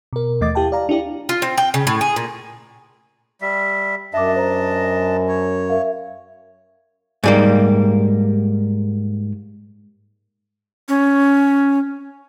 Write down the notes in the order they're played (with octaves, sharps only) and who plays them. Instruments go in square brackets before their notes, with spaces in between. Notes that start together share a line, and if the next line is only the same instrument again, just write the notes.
[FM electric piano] B2 A#4
D#2 E3 A3 D#5 D6 A6
E4 G4 F5 G5 A5
D5 F5 A#5
D4 E4 G4 D5
[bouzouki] F4
C4
G5
C#3
A2
G#4
A#2
[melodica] G3 E5
[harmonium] F#2 [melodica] D4 D#5 A5 [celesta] E5 D6
[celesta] C5 A#5
[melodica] C#5
[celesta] A#4 E5 F5
[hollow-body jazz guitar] G#2 G3 A#3
[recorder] C#4